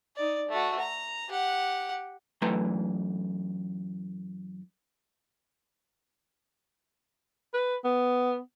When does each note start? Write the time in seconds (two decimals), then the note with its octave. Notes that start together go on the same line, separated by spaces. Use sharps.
0.16 D#4 D5
0.49 A3 F#4
0.79 A#5
1.29 G4 F#5
2.42 F#2 E3 A3 B4 A#5 C6
7.54 B4
7.85 B3